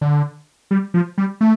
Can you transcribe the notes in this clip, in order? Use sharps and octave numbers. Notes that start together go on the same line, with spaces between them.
D3
G3
F3
G3
A3